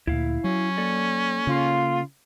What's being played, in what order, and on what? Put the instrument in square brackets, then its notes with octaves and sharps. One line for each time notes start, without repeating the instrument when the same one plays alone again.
[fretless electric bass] D2 A#2 [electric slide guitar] E4 F5
[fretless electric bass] F#3 [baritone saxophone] C#4
[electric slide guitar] A#3 A4 D5
[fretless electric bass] C#3 [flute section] F4